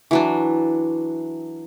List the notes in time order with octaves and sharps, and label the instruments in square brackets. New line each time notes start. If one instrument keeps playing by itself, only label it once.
[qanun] E3 F#3 D4